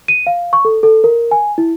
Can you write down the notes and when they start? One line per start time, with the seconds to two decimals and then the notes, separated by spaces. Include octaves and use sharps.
0.08 D#7
0.27 F5
0.53 C#6
0.65 A4
0.83 A4
1.04 A#4
1.31 G#5
1.58 E4